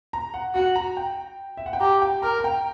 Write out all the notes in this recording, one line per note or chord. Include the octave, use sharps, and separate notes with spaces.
A#5
F#5
F#4 F#5
A#5
G5
E5
F#5
G5
G4 A#5
G5
A#4 A#5
A#5
G5